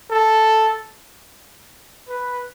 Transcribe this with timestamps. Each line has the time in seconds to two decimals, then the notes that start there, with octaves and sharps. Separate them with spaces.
0.10 A4
2.09 B4